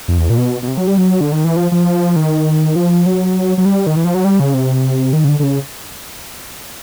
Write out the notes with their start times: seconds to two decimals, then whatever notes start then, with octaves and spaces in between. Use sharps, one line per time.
0.08 F2
0.18 E2
0.30 A#2
0.38 B2
0.62 B2
0.68 C3
0.77 F#3
0.87 G3
0.98 F#3
1.21 D3
1.32 D#3
1.44 E3
1.56 F3
1.72 F3
2.16 D#3
2.76 F3
3.06 F#3
3.58 F#3
3.65 G3
3.87 D#3
3.96 E3
4.04 F3
4.14 F#3
4.25 G3
4.40 C#3
4.54 C3
5.13 D#3
5.24 C#3
5.28 D3
5.40 D3
5.43 C#3